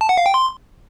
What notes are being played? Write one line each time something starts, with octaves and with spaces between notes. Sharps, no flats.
A5
F#5
F5
G5
C6